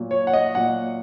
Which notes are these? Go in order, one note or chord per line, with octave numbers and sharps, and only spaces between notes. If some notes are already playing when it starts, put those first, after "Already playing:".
Already playing: A#2 F#3
C#5
F#5
D#5
A#2 F#3 F#5